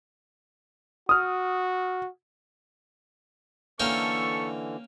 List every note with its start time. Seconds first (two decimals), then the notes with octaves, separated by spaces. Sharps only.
1.09 F#4 D#6 F6
3.80 D3 E3 A3 A#3 C#4 A4 G5 C#6